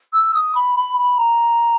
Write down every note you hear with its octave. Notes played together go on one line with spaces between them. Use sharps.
E6
D#6
B5
B5
B5
A#5